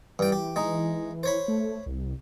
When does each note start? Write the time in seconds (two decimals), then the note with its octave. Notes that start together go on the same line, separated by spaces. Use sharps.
0.19 G2 E3 G5
0.32 G4
0.56 G#3 D#4
1.23 C5 C#5 B5
1.48 A3
1.86 C2